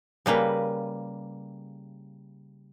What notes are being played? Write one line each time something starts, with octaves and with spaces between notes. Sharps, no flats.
C#3 G3 A#3 B4